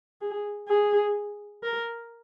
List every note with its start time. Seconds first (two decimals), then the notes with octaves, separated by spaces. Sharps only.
0.21 G#4
0.68 G#4
1.63 A#4